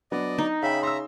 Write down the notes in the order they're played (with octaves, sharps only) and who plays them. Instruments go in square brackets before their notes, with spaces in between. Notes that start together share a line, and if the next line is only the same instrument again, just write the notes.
[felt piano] F#3 B3 D4 [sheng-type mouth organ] D5 D#5
[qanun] D#4
[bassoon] C#3 [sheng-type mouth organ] E5 B5 [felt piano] F5 G5
[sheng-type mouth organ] E5 A#5 [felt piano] C6 E6